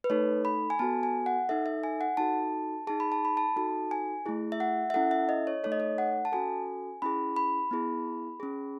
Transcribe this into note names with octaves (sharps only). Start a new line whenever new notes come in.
B4
A3 D#4 A4 C#5
B5
G#5
B3 F#4 A4 A5
G#5
F#5
D#4 A4 E5
E5
G#5
F#5
D#4 F#4 A4 A5
D#4 G#4 A5
B5
A5
B5
A5
D#4 F#4 A4 A5
G#5
A3 E4 G#4
E5
F#5
E5
C#4 E4 A4 F#5
E5
D#5
C#5
A3 D#4 A4 C#5
D#5
C#5
F#5
A5
C#4 F#4 A4 G#5
C#4 E4 G#4 B5
B5
B3 E4 G#4
C#4 G#4